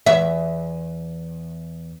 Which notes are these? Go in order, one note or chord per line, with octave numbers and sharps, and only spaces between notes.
E2 E5